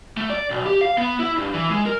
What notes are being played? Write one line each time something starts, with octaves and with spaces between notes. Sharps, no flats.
A3
D5
B1
G4
F5
B3
E4
G2
E3
G#3
A#4